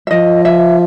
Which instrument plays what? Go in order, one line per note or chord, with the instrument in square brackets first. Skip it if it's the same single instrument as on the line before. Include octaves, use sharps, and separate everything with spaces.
[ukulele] E5
[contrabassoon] F3 [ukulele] D#5
[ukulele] E5